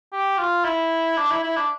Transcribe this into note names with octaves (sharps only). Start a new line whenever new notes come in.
G4
F4
E4
D4
E4
E4
D4